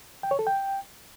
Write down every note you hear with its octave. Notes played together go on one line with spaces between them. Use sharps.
G5
C#5
A4
G5